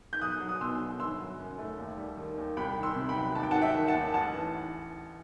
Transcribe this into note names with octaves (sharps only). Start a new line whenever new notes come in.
G6
B1 D#6 F#6
F#3
D#6
B2 C6 E6
B1
G1 C6 E6
F#3
F#2
A3
D#2
G3
D#3
D#2
C2 G5 B5
D#3
C6 E6
C3
G5 B5
F#3
D#2 A5
G5
F#5 A5
F#3
E5 G5
D#3
F#5 A5
D#2
A1 F#5 A5
E3